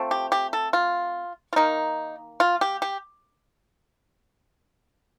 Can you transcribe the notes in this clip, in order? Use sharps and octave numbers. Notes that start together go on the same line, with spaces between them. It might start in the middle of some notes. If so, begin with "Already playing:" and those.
Already playing: F3 A3 C4
G4
G4
A4
F4
F4
D#3 A#3 D#4
F4
G4
G4